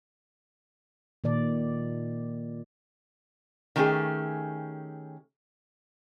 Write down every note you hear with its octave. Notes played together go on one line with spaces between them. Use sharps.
A#2 D#3 D5
D#3 A3 C#4 G4 G#4